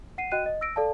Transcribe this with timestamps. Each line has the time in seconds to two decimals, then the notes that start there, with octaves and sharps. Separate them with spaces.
0.18 F#5 C7 D#7
0.32 F#4 D#5 G5 F#6 D#7
0.46 D#5
0.61 E6 A#6 D7
0.76 A4 D5 F5 A5